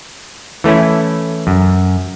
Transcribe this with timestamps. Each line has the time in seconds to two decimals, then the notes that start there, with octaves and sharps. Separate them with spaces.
0.64 E3 A3 C#4 E4
1.47 F#2